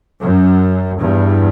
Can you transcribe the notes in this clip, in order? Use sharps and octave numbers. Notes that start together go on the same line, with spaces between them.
F#2
E2 G2